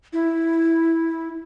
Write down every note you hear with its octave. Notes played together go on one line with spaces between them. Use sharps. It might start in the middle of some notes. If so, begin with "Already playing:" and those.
E4